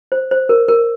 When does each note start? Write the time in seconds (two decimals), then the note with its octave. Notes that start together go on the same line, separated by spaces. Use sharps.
0.12 C5
0.31 C5
0.49 A#4
0.68 A#4